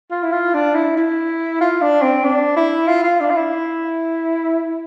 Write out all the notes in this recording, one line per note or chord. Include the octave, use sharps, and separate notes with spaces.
F4
E4
F4
D4
E4
E4
F4
D4
C4
D4
E4
F4
F4
D4
F4
E4